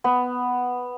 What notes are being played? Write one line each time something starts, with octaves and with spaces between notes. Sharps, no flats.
B3